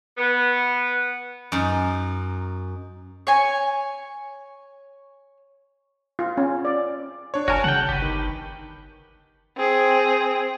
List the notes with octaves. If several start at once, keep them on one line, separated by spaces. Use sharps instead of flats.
B3
F#2 D#4
C#5 G#5
F4
C#4
D5
D4 C#5
F#1 F#4 A#4 C#5 G#5 A5
C#3 F#5 G5 A5
G1 G4 B4
D#3
C4 G#4